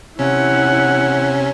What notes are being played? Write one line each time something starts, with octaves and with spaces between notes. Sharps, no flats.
C3 C#4 E4 F#5